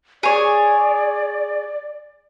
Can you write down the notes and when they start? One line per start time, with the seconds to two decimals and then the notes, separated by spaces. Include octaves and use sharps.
0.23 G#4 C#5 D5